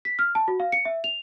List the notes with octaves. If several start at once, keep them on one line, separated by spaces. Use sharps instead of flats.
B6
F6
A5
F#4
F5
C#7
E5
F7